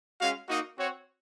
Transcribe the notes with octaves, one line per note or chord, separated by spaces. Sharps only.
G#3 C#4 F#4 F5
A#3 D#4 F#4 D#5
C4 F#4 C#5